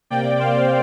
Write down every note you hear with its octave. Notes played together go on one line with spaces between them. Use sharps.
C3 A#3 D5 G5
C5 F5